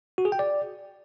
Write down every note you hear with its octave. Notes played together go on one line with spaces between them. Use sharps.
F#4
G#4
G5
D5